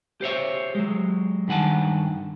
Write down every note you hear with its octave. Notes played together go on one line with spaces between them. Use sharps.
G4 C5 C#5 E5
F#3 G#3
G2 D#3 F#5 G#5 A5